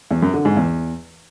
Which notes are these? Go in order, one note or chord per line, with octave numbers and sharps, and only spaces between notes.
E2
F#2
D3
G#2
E2